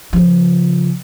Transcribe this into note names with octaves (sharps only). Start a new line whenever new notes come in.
C#3 F3